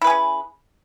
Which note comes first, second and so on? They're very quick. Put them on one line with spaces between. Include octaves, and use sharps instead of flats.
E4 B4 G#4 C#4